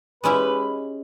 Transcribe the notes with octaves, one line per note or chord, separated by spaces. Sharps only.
G#3 C#4 E4 G4 B4